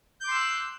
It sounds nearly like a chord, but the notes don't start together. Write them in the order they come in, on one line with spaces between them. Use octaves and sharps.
G6 D6 C6 E6 F#6